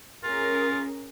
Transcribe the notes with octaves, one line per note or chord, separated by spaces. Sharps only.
C#4 F4 G#4 A#4